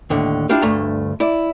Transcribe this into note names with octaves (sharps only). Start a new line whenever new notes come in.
D#2 A2 D3
D4 E4 F4 G4
D2 G2 D3 A3 A#5
E4 D5